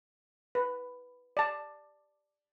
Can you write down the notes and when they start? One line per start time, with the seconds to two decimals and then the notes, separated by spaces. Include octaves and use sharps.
0.55 B4
1.37 D5 A5